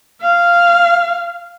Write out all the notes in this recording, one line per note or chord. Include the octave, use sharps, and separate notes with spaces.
F5